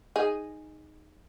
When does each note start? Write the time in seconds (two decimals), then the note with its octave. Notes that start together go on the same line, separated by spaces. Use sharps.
0.16 D#4 G#4